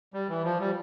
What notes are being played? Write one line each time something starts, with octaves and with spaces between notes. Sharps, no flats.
G3
E3
F3
G3